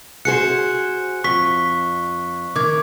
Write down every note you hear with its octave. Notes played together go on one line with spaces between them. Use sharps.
F#4 G#4 C5 F#6 C#7
F2 C#6 B6 G7
D#3 D6 G#6